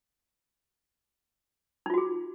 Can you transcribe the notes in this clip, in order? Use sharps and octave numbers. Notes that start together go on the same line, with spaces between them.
D#4 F4 F#4 G#4